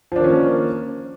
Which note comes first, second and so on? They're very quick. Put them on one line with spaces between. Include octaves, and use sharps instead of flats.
F3 D4 D#3 C#4 A#3